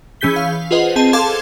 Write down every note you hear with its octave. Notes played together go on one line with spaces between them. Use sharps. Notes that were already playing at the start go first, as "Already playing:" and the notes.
E3 C#4 G#4 G6 B6 G7
F5
F4 G#4 B4 C5 D#5 F#5
C4 G#4 A5
A4 F5 A5 C6 D6 G#6